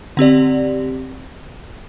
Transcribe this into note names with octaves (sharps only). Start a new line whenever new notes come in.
D3 C4 G4 D5